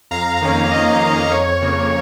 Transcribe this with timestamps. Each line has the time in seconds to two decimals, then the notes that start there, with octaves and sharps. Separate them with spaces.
0.11 F2 F5 A#5
0.41 D#3 A#3 C#4
0.71 F2 D#5
1.01 D#3 A#3 C#4
1.31 F2 C#5
1.61 C#3 A#3